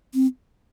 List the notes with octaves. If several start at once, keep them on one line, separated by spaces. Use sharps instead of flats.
C4